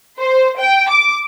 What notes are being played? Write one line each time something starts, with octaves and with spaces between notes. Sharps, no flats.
C5
G5
D6